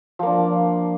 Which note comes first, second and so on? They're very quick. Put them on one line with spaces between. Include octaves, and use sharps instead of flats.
F3 A#3 D4